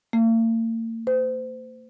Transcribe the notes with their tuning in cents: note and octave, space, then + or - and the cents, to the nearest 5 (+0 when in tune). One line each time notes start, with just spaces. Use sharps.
A#3 -45
C5 -30